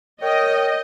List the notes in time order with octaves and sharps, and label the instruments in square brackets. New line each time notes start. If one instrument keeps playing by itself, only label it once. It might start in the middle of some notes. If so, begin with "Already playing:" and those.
[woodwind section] A#4 C#5 G5 [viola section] D#5